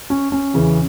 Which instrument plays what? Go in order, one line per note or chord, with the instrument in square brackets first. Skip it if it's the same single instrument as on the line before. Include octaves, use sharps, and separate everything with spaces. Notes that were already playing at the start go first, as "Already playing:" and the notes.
[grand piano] C#4
C#4
E2 C#3 E3